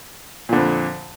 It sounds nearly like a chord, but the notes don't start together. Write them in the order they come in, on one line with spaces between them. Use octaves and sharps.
A#2 D3 F2